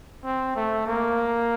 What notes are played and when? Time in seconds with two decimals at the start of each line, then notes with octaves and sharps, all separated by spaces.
0.24 C4
0.56 A3
0.87 A#3